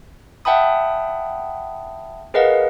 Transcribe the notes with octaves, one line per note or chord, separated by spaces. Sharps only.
E5 F#5 G5 A5 B5 D#6
G#4 A#4 B4 D#5 F5 F#5